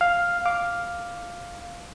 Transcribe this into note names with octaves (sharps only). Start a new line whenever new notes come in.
F5
F5 D6